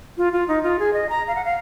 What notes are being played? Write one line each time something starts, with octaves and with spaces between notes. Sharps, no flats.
F4
F4
D#4
F4
G#4
D#5
A#5
F5
F#5
F5